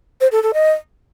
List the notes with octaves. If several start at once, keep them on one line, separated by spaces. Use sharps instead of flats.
C5
A4
A4
D#5